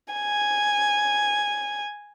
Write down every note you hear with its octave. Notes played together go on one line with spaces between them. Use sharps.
G#5